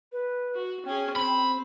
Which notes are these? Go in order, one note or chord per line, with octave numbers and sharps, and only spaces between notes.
B4
F#4
C#4 G#4 G5
C4 B5